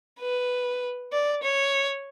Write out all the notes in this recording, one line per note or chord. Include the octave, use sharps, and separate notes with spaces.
B4
D5
C#5